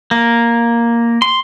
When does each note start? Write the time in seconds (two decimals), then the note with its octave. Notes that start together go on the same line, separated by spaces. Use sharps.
0.11 A#3
1.22 C6